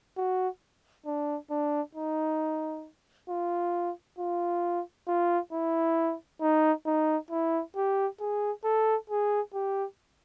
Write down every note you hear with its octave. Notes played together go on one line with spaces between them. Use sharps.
F#4
D4
D4
D#4
F4
F4
F4
E4
D#4
D#4
E4
G4
G#4
A4
G#4
G4